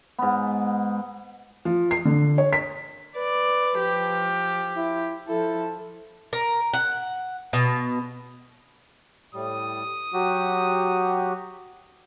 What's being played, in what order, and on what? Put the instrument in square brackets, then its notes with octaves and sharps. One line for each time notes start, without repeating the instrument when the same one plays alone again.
[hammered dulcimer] G#2 B3
[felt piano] F3
C7
D3
C#5
B6
[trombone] B4 [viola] D5
[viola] F3 G4
[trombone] E4
[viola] F3 A4 [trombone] E4
[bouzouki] A#4
F#5
B2
[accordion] A2 G3 [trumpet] D#6
[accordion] F#3 F#4 G4